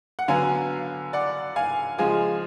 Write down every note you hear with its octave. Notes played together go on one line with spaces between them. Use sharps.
F#5
D3 F#3 B3 F5 G#5
D5 F#5
F5 G#5
C#3 F3 G#3 F5 G#5